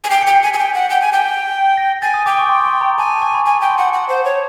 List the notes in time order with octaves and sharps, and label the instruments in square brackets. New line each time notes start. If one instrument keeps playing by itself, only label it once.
[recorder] G#5
[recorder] G5 [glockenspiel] C7
[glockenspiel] C#7
[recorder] G5
[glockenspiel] C7
[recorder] G#5
[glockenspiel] B6
[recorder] G#5
G5
F#5
G5
G#5
G5
[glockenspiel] A#6
[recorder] G#5 [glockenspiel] A6
[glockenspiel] D#6
[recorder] G5 [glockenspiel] D6
[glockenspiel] C#6
C6
C6
A#5
[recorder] G#5 [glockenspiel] A5
[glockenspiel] A#5
C#6
B5
[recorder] G#5 [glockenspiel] A#5
[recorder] G5
[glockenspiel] C6
[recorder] F#5
F#5
C5
C#5